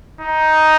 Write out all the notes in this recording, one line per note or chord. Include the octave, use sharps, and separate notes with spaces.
D#4